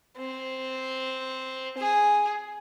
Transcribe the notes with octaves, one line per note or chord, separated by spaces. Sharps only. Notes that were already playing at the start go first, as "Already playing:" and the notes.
C4
G#4